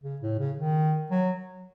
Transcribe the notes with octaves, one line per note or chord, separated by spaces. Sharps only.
C#3
A2
C#3
D#3
F#3